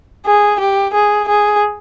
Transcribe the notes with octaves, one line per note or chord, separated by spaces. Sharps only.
G#4
G4
G#4
G#4